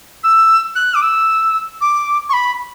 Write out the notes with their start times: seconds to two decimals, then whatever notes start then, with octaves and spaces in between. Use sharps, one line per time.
0.23 E6
0.75 F#6
0.94 D6
1.01 E6
1.80 D6
2.29 C#6
2.33 B5